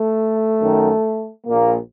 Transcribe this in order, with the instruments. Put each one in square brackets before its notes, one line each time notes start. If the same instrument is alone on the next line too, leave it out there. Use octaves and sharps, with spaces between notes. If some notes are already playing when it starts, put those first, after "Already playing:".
Already playing: [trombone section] A3
F#2 D#3
A#1 A#2 A#3